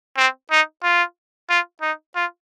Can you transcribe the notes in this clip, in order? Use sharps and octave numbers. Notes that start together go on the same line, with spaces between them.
C4
D#4
F4
F4
D#4
F4